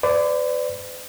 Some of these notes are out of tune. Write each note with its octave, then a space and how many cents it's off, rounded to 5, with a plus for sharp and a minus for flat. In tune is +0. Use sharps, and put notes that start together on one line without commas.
B4 +45 D5 +0